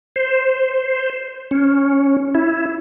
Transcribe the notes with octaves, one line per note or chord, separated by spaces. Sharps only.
C5
C#4
E4